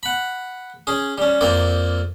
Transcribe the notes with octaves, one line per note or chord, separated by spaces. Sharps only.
F#5 B5
C#4 G#4
G3 C#4
F2 A#3 C4 D5